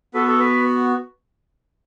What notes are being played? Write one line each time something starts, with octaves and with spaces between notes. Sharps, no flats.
B3 F#4 A4 B4
A4
B4